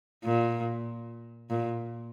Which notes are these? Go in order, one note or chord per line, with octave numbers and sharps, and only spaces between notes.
A#2
A#2